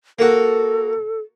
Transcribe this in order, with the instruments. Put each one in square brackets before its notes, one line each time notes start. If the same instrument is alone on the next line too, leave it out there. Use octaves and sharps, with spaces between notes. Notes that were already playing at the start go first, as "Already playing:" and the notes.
[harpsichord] A#3 F#4 [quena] A4